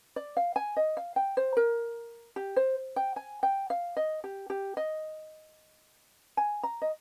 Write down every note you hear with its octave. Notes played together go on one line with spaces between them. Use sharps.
D5
F5
G#5
D#5
F5
G5
C5
A#4
G4
C5
G5
G#5
G5
F5
D#5
G4
G4
D#5
G#5
A#5
D#5